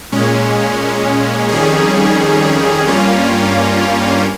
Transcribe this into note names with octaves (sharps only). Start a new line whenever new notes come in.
A#2 G#3 C#4
F2 D#3 G3 C#4 G#4
G2 G3 A#3 C#4 F4